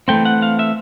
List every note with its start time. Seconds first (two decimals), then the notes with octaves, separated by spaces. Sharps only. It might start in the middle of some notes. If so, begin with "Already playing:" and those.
0.08 E3 A3 C4 G5
0.25 F#5
0.42 F5
0.59 E5